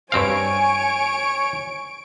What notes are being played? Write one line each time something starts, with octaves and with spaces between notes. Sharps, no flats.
G2 C4 C#5 F5 G#5 C#6 D7